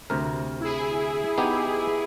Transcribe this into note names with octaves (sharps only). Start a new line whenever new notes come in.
D2 C3 A#4
E4 G#4
B3 D#4 G4